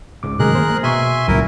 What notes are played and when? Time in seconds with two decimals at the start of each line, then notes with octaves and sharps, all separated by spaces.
0.23 C#2 G#2 D6
0.39 F#2 C3 D#3 G#3 A3 G#4 A#4 F#6
0.55 A#3 C5
0.83 B2 E5 G#5 C6 C#6
1.28 C#2 G2 A#2 C#3 F#3 E4 A#4